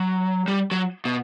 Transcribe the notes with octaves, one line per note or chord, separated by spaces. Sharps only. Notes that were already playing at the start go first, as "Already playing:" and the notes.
Already playing: F#3
G3
F#3
B2